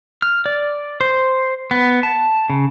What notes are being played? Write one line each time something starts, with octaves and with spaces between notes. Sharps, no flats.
F6
D5
C5
B3
A5
C#3